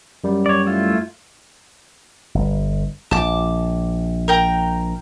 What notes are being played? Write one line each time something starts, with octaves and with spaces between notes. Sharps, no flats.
F#2 G3
C#5 D5
A3 E4 F4
G1
A#1 A5 D6
A#4 G5 A#5